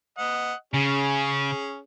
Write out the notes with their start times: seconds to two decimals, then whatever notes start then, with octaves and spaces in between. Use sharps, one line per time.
0.18 D#5 F#5
0.74 C#3 C#4 G#4